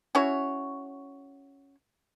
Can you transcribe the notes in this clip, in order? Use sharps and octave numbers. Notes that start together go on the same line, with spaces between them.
C#4 E4 F#4 C#5